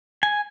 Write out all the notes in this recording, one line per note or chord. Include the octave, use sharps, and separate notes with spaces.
G#5